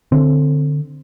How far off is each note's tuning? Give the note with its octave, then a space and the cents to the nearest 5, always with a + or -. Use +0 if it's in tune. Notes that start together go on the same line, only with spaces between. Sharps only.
D3 +10 C4 +0